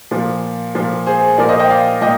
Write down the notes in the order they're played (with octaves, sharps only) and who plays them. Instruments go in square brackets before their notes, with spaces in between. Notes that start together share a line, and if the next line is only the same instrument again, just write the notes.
[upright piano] A#2 F3
A#2 F3
G#4 C5
A#2 F3 A#4 D5
C5 D#5
D#5 G5
D5 F5
A#2 D#5 G5